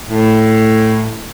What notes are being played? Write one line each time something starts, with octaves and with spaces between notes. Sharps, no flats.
A2